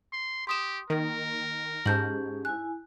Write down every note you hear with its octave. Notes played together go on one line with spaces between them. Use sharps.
C6
G4 C6 D#6 E7
D#3 A#3 A#4
G#2 C#4 G4 G#4 A5 G6 F#7
E4 G#5 F#6